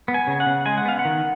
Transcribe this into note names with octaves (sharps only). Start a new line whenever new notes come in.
B3
G#5
C#3
F#5
C#3
G#3 G#5
F#5
B3 F5
F#5
D#3